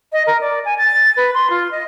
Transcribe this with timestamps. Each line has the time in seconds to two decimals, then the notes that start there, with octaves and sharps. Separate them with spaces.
0.13 D#5
0.27 A#4
0.41 D5
0.65 G#5
0.78 A6
1.17 B4
1.34 C6
1.50 F4
1.71 D#5